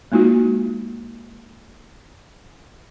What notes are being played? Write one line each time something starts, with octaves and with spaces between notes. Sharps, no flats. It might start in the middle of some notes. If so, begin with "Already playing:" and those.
G#3 A#3 D#4 F4 F#4